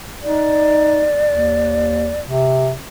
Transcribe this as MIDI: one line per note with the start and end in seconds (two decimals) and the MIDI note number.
0.23 1.05 63
0.23 2.20 74
1.28 2.16 39
2.23 2.73 48